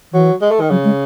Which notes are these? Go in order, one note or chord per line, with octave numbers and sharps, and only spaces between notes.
E3 F#3
G#3
A3
D#3
C#3 F#3
G#3